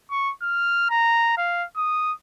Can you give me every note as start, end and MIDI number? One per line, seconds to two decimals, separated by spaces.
0.11 0.32 85
0.42 0.86 89
0.90 1.37 82
1.37 1.65 77
1.77 2.13 87